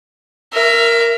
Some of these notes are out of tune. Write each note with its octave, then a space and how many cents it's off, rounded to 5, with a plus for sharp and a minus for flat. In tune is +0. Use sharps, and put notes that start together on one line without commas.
A#4 +0 E5 +25